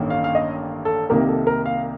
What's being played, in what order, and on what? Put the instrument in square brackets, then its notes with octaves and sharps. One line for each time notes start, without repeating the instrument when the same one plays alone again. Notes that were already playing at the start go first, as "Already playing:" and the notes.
Already playing: [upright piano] A1 G2 D#3 A#3
F5
F5
D#5
A4
C2 C3 D#3 A#3 A#4
A4
A#4
F5